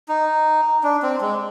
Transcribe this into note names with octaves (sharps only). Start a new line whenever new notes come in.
D#4
D4
C4
G#3